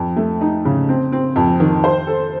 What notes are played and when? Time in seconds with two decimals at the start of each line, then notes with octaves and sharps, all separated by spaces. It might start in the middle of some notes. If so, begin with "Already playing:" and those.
Already playing: F2
0.16 A3
0.41 D#4
0.65 C#3
0.89 C4
1.12 C4
1.36 F2
1.60 D#3
1.84 C5
2.07 A4